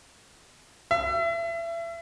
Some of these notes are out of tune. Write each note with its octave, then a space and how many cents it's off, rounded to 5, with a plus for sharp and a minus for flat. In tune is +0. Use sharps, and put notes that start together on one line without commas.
E5 +30